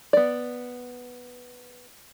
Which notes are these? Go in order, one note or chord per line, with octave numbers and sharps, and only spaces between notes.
B3 D5